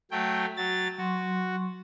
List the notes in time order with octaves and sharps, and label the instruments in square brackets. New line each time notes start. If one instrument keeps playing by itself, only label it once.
[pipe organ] F#3 A3 G5
F#3 A6
[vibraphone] F#3 C6 C#6 [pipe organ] F#4